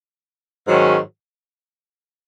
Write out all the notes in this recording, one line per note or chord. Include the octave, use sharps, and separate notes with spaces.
G#2 D#3 F#3 C#4